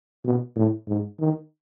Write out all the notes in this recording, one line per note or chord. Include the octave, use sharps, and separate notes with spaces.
B2
A2
G#2
D#3